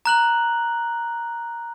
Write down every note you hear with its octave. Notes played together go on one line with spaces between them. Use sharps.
A#5 F#6 F#7